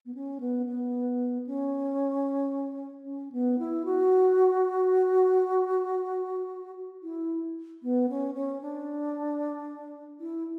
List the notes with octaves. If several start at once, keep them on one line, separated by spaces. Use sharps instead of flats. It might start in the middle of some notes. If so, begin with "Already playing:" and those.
B3
C#4
B3
B3
C#4
C#4
B3
E4
F#4
E4
B3
C#4
C#4
D4
E4